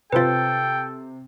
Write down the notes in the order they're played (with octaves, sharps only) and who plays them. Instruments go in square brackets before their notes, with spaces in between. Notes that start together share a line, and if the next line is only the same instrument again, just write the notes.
[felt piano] C3 C5 A6 [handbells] F4 B4 [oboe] A4 [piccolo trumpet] G5